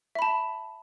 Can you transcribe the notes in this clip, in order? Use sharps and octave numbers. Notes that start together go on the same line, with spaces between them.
E5 A5 B5